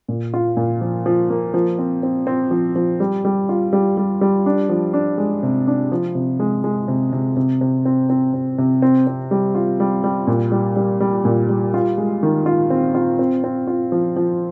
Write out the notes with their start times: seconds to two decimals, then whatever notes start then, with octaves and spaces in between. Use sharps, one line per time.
0.08 A#2
0.34 F4
0.57 A#2
0.81 F3
1.06 F3
1.30 A#3
1.54 F3
1.79 C4
2.03 C4
2.27 C4
2.51 F3
2.76 F3
3.00 G3
3.25 G3
3.49 F4
3.73 G3
3.97 G3
4.21 G3
4.46 D4
4.69 F3
4.93 D4
5.18 G#3
5.43 C3
5.67 D4
5.92 F3
6.15 C3
6.40 G#3
6.64 G#3
6.88 C3
7.13 C3
7.37 C3
7.61 C3
7.85 C4
8.10 C4
8.34 C3
8.58 C3
8.82 C4
9.07 C4
9.31 G3
9.55 F4
9.80 G3
10.04 G3
10.27 A#2
10.52 G3
10.76 G3
11.00 G3
11.25 A#2
11.49 G3
11.74 F4
11.98 G#3
12.23 D#3
12.46 F4
12.70 C4
12.95 F4
13.19 C4
13.44 C4
13.67 F4
13.92 F3
14.16 F3